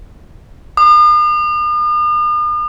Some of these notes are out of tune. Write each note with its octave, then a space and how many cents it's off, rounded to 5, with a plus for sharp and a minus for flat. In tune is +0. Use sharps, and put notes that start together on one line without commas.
D#6 -45